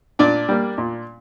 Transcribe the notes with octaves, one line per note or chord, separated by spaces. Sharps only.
A#2 D4 D5
G3 A#3
A#2